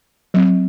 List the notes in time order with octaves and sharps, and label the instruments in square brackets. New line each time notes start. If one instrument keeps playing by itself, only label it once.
[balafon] F#3 C4